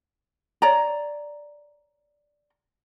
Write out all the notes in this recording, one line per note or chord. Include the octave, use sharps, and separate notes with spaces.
C#5 D5 A#5